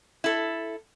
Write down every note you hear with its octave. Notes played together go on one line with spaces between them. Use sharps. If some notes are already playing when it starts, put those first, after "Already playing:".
E4 A4